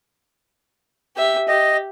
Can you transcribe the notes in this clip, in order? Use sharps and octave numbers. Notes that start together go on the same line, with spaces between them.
G4 E5
G4 D#5